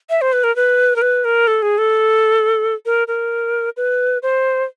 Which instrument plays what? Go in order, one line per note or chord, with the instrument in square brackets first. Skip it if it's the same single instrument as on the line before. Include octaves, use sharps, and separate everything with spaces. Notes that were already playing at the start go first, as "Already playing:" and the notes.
[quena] E5
C5
B4
A#4
B4
A#4
B4
A#4
A4
G#4
A4
A#4
A#4
B4
C5